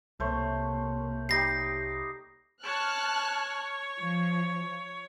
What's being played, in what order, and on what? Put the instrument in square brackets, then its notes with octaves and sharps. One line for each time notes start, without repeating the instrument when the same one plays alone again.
[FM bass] C2 [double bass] C3 A#3 [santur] A3 C5 C#5
[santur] G3 D#4 G4 [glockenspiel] A#6 C7
[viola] C#5 [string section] A5 F6 F#6
[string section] F3